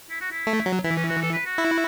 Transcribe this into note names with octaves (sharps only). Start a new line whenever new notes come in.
E4
F#4
E4
A3
F#3
E3 E4
C#4
F#4
A4
B4
F#4
E4